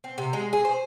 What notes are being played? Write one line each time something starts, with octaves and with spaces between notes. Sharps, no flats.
C4
C3
G#3
G#4
C5